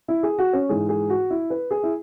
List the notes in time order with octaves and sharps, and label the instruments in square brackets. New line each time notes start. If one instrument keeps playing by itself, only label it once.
[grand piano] E4
G#4
F#4
C#4
G#2 E3 G#3 G#4
G#4
F#4
E4
B4
G#4
E4